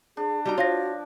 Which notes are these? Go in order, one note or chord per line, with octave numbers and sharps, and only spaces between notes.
D4 G#4
G3 D#4 F#4 A#5
F3 F4 C#5 F5 A#6